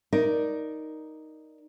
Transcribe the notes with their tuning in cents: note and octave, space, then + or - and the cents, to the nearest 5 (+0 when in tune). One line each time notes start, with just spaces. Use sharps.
D#4 +0 A#4 +5 D5 +0